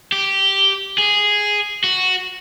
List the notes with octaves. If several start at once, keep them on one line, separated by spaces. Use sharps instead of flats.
G4
G#4
F#4